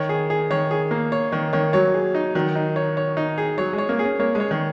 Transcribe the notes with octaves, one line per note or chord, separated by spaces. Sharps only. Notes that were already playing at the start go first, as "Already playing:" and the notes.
Already playing: D#3 C#5
G#4
G#4
D#3 C#5
G#4
A#3
C#5
D#3 C#5
D#3 C#5
F#3 C#5
G#4
D#4
D#3 F#3
D#4
C#5
C#5
D#4
G#4
F#3 C#5
G#3
C#5
A#3
G#4
C#4
A#3 C#5
G#3
C#5
D#3